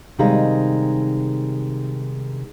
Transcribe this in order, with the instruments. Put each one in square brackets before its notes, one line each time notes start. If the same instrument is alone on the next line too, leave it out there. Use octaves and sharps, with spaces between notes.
[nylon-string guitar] C3 D#3 G3 G#3 D#4 F5